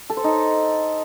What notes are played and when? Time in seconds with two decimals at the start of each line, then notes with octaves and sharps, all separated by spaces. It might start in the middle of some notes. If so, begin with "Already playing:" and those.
0.10 A4
0.17 C5
0.24 D#4